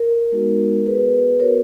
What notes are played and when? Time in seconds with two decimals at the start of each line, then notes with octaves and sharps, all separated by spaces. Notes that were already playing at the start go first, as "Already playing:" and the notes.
Already playing: A#4
0.32 G#3 B3 D#4 F#4
0.86 B3 F#4 G#4 B4
1.40 B3 F#4 A#4 C#5